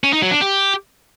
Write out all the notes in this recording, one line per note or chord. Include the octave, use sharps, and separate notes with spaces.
C#4
D#4
F#3
D4
G4